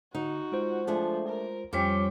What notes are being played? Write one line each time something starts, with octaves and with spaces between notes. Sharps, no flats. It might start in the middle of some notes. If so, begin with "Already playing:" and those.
D3 D#4 F#4
G#3 F4 C5
F3 A3 D4 G#4
A#4
F2 F3 G3 C#4 G4 C#5 D6